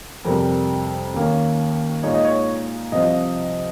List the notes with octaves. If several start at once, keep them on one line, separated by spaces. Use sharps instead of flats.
F2 C3 G3 A#4
D#2 D#3 A#3 C#4
A#2 G#3 D#4 C#5
D#5
C#5
C2 C3 F3 D#5